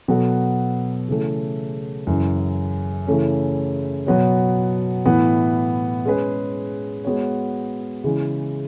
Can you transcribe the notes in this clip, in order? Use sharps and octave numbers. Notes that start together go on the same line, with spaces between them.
B2 F#3 B3 F#4 A4
C#3 E3 A3
F#2 C#3 E3
C#3 E3 A3 C#4
B2 F#3 B3 F#4 C#5
A2 E3 B3
G#3 C#4 G#4 B4
G#3 B3 F#4 C#5
C#3 E3 G#3